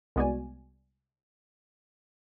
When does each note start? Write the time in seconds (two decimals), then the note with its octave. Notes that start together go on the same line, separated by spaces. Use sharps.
0.16 C2 G#3 B3 F#4 D5 G#5